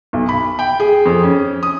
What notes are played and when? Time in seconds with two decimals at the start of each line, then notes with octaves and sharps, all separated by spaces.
0.13 B1
0.29 B5
0.59 G5
0.80 G#4
1.06 F2
1.23 C#4
1.63 D#6